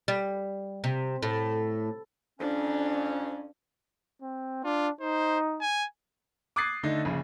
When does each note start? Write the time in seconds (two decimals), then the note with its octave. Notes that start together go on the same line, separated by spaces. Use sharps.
0.08 G3
0.84 C3
1.23 A2
2.40 F2 C#4 D4
4.22 C4
4.64 D4 F4
5.00 D#4 C5
5.61 G#5
6.56 D6 D#6 F#6 G#6 A6 C7
6.83 D3 A3 D#4
7.05 A#1 C#3